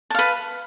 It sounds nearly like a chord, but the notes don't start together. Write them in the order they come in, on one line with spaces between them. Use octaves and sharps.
A5 F5 B4